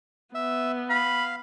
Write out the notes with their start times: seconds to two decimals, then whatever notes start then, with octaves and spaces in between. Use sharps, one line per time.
0.35 B3 E5
0.90 F5 B5